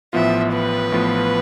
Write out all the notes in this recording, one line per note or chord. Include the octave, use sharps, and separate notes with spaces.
A1 A2 F3 B3 F4 E5
B4
A1 A2 F3 B3 F4